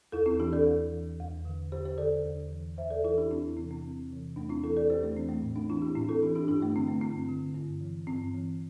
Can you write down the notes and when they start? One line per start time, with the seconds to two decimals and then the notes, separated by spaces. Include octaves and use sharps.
0.12 E2 E4 A4
0.26 C4 E4
0.39 E3 D4 G4
0.52 A4 D5
0.66 E2
0.92 E3
1.19 E2
1.45 D3
1.72 E2 G4 C5
1.85 G4 C5
1.98 D3 A4 D5
2.24 E2
2.51 E3
2.77 E2 C5 E5
2.90 A4 D5
3.04 E3 E4 A4
3.18 D4 G4
3.31 E2 C4 E4
3.57 C3 E3 C4
3.71 C4
3.84 E2
4.10 C3 E3
4.36 E2 A3 D4
4.49 C4 E4
4.64 E3 E4 A4
4.77 A4 D5
4.89 E2 G4 C5
5.03 A3 D4
5.16 E3 C4
5.29 A3
5.42 A2
5.55 A3 D4
5.70 E3 C4 E4
5.82 D4 G4
5.95 A2 C4 E4
6.09 E4 A4
6.22 E3 D4 G4
6.35 D4 G4
6.48 G2 D4 G4
6.61 A3 D4
6.75 D3 C4
6.88 A3
7.01 G2 C4
7.29 D3
7.54 G2
7.81 E3
8.07 G2 C4
8.34 E3